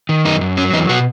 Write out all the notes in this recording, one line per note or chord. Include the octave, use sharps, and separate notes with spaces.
D#3
F#2 D#4
F#2
F#3 C#4
E2 D#4
B2 F#4